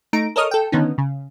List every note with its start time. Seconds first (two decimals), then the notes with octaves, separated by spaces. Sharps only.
0.13 A3 D#4 A#5 D7
0.36 A4 A#4 C#5 D#5 D#6 F6
0.51 A4 G5
0.72 D3 D#3 B3 C#4 D#4
0.98 C#3